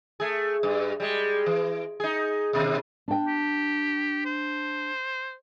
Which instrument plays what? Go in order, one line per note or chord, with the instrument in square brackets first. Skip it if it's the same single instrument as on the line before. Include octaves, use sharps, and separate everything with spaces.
[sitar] A3 G#4
G2
G3 G#3
E3
D#4 G#4
D#2 B2
[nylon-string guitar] D4 G5
[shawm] G4
C5